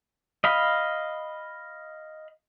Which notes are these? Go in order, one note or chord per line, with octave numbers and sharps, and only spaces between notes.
D#5 F5 B5